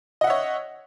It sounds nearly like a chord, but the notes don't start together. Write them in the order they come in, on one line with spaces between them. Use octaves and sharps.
D#5 F#5 E5 C#5